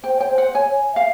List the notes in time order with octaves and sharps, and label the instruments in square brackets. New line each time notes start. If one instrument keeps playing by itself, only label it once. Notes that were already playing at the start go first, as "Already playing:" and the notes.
[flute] C5 [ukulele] G5
[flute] C#5 [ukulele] G5
[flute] C5
[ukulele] F#5
[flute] C#5 [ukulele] G#5
[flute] C#5
[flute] E5 [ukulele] F5